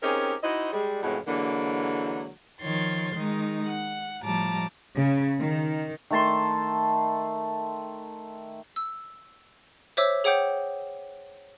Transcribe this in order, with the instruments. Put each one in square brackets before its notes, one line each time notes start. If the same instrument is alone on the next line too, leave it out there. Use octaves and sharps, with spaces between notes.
[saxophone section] C4 C#4 D#4 G4 G#4 A#4
D#4 E4 F#4 C5 D#5
G3 G#3
F2 A2 C#3 E3 G#3 F#4
D3 E3 F#3 G#3 A#3
[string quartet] D#3 F3 C#5 C6 A6
D#3 G#3 D#4
F#5
A2 F3 G3 A5 A#5 D6
[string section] C#3
D#3
[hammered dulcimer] D#3 A3 A5 C6
[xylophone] E6
C5 C#5 E5 D6 E6
G#4 C#5 F#5 G5 D6 G6